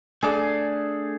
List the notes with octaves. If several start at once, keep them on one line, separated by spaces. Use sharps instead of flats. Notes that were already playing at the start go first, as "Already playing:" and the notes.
A3 D4 G#4 A4 D5